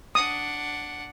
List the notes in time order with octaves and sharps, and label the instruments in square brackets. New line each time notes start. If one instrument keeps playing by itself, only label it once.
[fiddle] D4 F#5 [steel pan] D#6